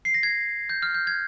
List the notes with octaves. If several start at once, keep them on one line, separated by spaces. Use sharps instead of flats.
C7
A#6
G#6
G6
F6
G6
G#6